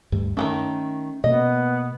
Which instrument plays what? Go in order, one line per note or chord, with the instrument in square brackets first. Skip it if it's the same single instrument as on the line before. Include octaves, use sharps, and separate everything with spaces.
[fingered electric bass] D2 G2
[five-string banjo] D#3 E3 A3 [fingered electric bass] C#4
[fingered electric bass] B2 A#3 [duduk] B3 [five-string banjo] D#5